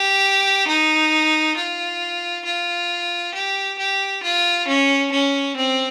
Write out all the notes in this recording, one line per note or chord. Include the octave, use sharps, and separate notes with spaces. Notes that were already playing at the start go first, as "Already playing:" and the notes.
Already playing: G4
D#4
F4
F4
G4
G4
F4
C#4
C#4
C4